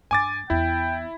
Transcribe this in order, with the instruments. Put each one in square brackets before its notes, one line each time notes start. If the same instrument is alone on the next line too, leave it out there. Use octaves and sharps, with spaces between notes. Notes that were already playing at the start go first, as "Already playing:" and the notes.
[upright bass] G2 [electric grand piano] G#5 D6 A6
[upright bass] E2 B3 [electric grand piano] E4 [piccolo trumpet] G5